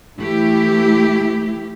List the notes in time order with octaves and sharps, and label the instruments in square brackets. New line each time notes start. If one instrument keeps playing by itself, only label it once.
[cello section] E3 A3 E4 G4